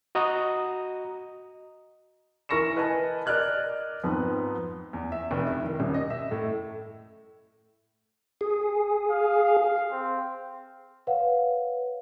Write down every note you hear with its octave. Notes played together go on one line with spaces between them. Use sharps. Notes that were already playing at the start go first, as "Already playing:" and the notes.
F#4 D#5 A#5 D#6
E3 A#4 C#6 A#6 C#7 E7
A#4 B4 D#5 G#5 A5
A#4 D5 D#5 F6 F#6 G#6
F2 G#2 B3
E2
E5
F1
E4
D#3
D#1
D#5
E5
A2
G#4
F5
C4
B4 C#5 F5 F#5